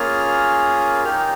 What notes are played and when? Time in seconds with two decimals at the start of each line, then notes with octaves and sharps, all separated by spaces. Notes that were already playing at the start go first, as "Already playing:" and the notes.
Already playing: A#3 C#4 F4 G#4 F6
1.04 A#3 D#4 G4 F6